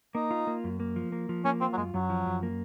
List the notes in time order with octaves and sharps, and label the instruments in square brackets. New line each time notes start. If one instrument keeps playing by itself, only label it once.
[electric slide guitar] A#3 [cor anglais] D#4
[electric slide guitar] F4
A#3
F#2
A#3
F3
A#3
F3
[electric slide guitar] A#3 [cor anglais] C#4
[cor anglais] C4 [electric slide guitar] F4
[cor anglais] F#3
[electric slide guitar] F#2 [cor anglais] G#3
[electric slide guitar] F#2 [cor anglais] F#3
[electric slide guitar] F3
F#2
A#3